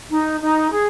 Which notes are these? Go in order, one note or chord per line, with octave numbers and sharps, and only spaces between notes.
D#4
D#4
G#4